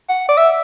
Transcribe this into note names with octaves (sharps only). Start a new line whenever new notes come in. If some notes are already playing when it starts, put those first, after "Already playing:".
F#5
D5
E5